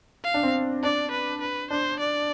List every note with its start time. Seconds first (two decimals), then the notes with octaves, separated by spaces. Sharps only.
0.24 F5
0.34 D4
0.43 C4
0.83 D4 D5
1.11 B4
1.41 B4
1.70 D4 C5
2.00 D5